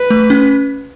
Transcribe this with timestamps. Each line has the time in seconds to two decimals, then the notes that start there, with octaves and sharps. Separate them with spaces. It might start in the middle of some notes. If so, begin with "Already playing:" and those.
Already playing: B4
0.10 A3
0.30 C#4